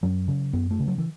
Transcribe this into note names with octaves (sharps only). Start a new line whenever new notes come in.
F#2 F#3
C#3
F#2 B3
A3
C#3
F#3
E3